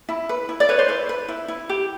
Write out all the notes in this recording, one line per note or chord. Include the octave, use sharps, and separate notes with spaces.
E4
B4
E4
D5
B4 C#5
C5
E4 B4
B4
E4
E4
G4